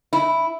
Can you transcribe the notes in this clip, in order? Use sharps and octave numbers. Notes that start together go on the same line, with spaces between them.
E4